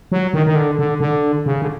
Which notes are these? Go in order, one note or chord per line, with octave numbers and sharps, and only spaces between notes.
F#3
D#3
D#3
D3
D3
D3
C#3
D3